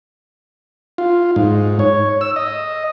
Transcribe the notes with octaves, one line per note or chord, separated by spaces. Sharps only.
F4
G#2
C#5
E6
D#5